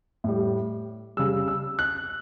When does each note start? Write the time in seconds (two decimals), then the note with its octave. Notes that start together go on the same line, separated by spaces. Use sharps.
0.24 A2 G3
1.17 C#3 G3 E6
1.48 E6
1.79 F#6